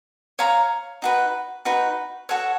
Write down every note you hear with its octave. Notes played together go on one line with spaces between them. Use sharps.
C#5 F5 A#5 C#6
D#4 F#4 B4
D#4 F#4 B4
F#4 A4 C#5 F#5